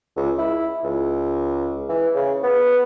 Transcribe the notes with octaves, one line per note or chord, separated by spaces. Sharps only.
C#2
E4
C#2
E3
C#3
B3